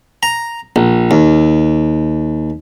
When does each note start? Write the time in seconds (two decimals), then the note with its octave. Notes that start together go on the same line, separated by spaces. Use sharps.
0.23 A#5
0.76 A#1
1.11 D#2